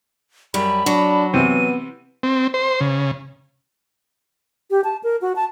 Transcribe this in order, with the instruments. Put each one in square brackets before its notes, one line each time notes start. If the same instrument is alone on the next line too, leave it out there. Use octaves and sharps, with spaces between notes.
[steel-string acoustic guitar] F#2 G3 [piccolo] B5
[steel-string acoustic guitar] F#3 [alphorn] D4
[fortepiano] C3 E3 C5 [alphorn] B3 [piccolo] D#7
[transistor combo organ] C4
C5
C#3
[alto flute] G4
A5
A#4
F#4
A5